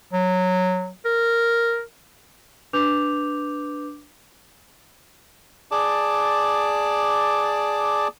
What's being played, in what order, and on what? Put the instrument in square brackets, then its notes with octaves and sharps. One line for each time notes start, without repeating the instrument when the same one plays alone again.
[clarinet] F#3
A#4
[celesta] D4 B4 D6 G6 F7
[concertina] G#4 D5 A5 D6